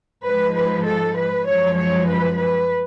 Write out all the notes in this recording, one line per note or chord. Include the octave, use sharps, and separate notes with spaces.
G#2 F3 G#3 B4
B4
A4
B4
F#2 F3 G#3 C#5
C#5
B4
B4